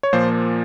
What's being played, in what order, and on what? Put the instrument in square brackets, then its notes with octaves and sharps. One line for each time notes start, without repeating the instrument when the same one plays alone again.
[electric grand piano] C#5
A#2 F3 A#3 C5